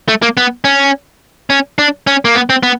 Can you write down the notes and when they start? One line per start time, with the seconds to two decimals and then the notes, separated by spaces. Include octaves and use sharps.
0.08 A3
0.22 A#3
0.37 B3
0.64 C#4
1.50 C#4
1.78 D4
2.07 C#4
2.25 A#3
2.35 B3
2.50 C4
2.63 B3